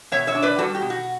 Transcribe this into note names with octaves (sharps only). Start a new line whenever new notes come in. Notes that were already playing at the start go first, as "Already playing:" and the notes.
B2 C#5 E5
C#5 E5
D4
B4 D5
G3 F#4 A4
G4
B2
F#4